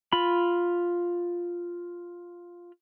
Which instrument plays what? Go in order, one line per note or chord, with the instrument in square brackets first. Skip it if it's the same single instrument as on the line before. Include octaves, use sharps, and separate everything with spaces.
[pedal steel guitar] F4 B5